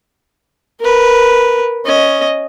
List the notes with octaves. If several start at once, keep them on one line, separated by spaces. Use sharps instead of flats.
A#4 B4
C#4 D#5